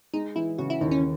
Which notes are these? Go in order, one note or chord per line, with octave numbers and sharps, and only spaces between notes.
G#3 D#4
E3 E4
C#3 F#4
E4
D#2 D#4
C#4